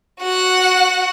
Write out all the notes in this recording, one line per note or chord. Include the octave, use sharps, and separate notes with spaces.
F#4 F#5